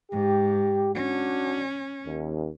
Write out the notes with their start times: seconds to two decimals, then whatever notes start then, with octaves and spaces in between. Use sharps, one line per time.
0.12 G#2 G4
0.95 C#4 D4 F#4
2.07 D#2